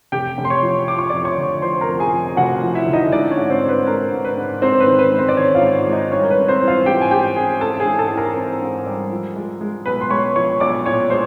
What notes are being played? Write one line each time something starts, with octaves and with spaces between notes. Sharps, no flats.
F1 G4 G5
F1
C6
C#5 C#6
F3
F3 D6
C#6
F2 D5 D6
C#5 C#6
D3
F3 C5 C6
A#4 A#5
F2
G#4 G#5
F2
F1 F#4 F#5
F3
E4 E5
D3
D#4 D#5
G#3 D4 D5
C#4 C#5
G#2
C4 C5
G#2
B4
G#2 A#4
G#2
B4
G#2
G#2 C4 C5
B4
D#3
B4
G#2
C4 C5
D5
D#3 C#4 C#5
F4 F5
G#2
G#3
D#4 D#5
G3 C#4 C#5
A#4
B4
C4
C4 C5
E3
F4 F5
G#2 G4 G5
G#5
G#2 G4 G5
C4 G#4 G#5
E3 A4 A5
G#4 G#5
G#2
A4 A5
E3
A#4 A#5
C4
G#2
G3
F3
G#3
G#3
B1 B4 B5
C6
G#3 C#5 C#6
F3 C#5 C#6
B1 D5 D6
A#2 C#5 C#6
G#3 C5 C6